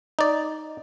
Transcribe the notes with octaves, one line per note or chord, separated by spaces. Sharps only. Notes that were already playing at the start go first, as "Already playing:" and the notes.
D#4 D5